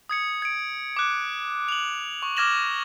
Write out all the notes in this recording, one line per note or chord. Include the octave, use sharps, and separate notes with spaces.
D#6 G#6 C#7
G#6 D7
D6 F#6
F7 F#7
C#6
D6 F6 G#6 A#6 E7 F#7